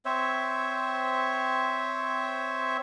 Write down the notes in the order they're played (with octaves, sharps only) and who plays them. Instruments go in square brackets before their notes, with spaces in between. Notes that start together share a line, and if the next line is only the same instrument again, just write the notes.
[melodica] C4 C5 C#5 E5